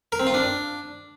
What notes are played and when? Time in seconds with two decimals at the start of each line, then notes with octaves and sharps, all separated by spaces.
0.12 A#4
0.20 C4
0.27 F4
0.34 D4